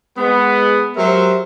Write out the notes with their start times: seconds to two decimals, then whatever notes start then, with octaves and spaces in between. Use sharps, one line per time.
0.17 G#3 B3
0.96 F#3 G#3 G4 A#4 C5 E5